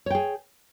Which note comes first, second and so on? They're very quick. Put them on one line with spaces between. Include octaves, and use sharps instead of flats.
C#5 G5 G#4